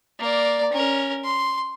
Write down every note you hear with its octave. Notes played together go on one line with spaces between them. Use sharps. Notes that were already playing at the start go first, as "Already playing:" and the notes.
A#3 D5
C#4 A#4
C6